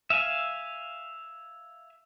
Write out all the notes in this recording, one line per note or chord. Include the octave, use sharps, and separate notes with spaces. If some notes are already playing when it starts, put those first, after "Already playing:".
E5 F5 G#5